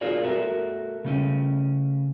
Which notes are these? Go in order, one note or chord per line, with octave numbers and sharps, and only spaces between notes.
F4 F#4 G#4 A#4 D5
A3 F#4 A#4
C#3 A3 C#4